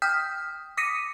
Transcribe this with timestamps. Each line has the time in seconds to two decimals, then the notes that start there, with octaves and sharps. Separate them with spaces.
0.02 G5 D#6 F6 G6 B6
0.77 D6 D#6 A#6 B6 C#7 D#7